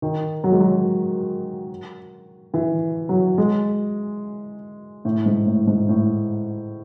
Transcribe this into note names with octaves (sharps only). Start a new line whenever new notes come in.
D#3
F#3
G#3
F#3
E3
F#3
G#3
A2
G#2
A2
G#2
A2